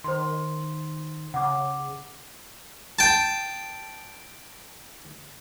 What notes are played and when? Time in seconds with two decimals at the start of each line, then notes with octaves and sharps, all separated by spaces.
0.04 D#3 C5 C6
1.34 C#3 F#5 D6
2.99 G5 A5